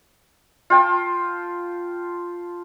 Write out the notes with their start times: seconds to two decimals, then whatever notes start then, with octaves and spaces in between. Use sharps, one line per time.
0.70 F4 G5 A5